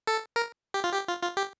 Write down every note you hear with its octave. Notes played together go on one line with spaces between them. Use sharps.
A4
A#4
G4
F4
G4
F4
F4
G4